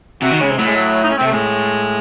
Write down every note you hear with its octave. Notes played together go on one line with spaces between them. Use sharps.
C3 F#4
D#3
C#3 G#3
C3
A2 F#3
G#3
F#3
D#4
C#4
C4
C3 A3
A2 G#3